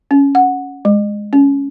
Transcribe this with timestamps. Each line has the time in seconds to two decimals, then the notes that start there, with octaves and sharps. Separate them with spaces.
0.11 C#4
0.35 F#5
0.85 G#3
1.33 C#4